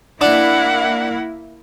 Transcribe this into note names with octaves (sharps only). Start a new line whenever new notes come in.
A#3 D4 E4 F#5